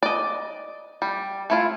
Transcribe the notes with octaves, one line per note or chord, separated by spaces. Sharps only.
D5 D#5
G3
A3 E4 F4